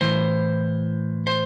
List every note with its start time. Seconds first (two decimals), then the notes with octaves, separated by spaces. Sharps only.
0.01 A2 E3 C5
1.27 C5